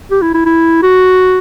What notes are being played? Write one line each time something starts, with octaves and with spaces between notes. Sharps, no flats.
G4
E4
E4
E4
F#4